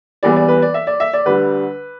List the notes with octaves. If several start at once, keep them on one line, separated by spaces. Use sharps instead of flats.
E2 E3 G3 D5
D5
B4
D5
E5
D5
E5
D5
D2 D3 G3 B4